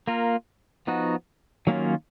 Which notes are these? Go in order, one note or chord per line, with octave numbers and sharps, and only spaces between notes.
A#3 F4 A#4
F3 B3 D#4 F#4
D#3 F#3 A#3 C#4 F4